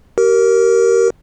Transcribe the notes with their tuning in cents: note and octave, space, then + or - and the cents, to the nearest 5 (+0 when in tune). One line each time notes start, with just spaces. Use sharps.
G4 -35 A#4 +0